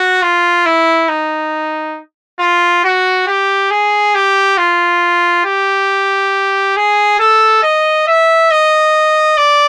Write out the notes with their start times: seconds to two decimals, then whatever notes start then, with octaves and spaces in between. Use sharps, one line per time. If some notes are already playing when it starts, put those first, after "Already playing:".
Already playing: F#4
0.22 F4
0.66 E4
1.09 D#4
2.39 F4
2.84 F#4
3.27 G4
3.71 G#4
4.15 G4
4.58 F4
5.45 G4
6.76 G#4
7.19 A4
7.63 D#5
8.07 E5
8.51 D#5
9.37 D5